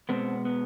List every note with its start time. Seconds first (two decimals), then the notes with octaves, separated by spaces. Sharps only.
0.09 B2 G#3 B3 C4
0.45 B3